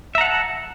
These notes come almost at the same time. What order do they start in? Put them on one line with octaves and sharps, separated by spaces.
E5 A#5 F#5 A5